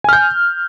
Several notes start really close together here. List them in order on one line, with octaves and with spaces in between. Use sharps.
G#5 F6 G6